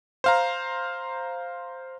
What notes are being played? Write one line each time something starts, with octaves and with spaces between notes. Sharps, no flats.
C5 F5 A#5